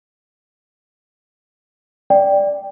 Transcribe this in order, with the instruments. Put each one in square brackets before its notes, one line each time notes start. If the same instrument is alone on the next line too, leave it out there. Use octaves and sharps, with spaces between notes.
[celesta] D5 G5